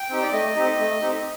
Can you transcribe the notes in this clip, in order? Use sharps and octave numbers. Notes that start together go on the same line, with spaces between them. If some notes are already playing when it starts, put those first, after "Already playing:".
Already playing: G5
C4 D#4 G4
D5
A3 D#5
C4 D#4 G4
A3
C4 D#4 G4